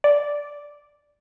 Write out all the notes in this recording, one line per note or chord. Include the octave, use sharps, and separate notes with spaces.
D5